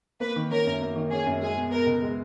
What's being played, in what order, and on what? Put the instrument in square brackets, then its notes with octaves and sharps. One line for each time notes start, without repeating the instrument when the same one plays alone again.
[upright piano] A#3 [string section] B4
[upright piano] D#3
[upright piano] C#4 [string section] A#4
[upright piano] F#2
A#3
D#3
[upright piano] C#4 [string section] G#4
[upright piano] F#2
[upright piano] G#3 [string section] G#4
[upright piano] B2
[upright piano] B3 [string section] A#4
[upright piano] C#2
G#3